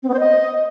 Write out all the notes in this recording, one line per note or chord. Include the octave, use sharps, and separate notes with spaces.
C4
B3
C5
D#5